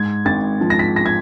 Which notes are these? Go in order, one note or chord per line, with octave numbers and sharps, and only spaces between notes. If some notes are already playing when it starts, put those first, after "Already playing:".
Already playing: G#2 G#6
G#1 A6
F3
A#6
B6
A#6
G#6